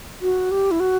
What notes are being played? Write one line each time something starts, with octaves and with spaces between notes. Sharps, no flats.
F#4
G4
E4
F#4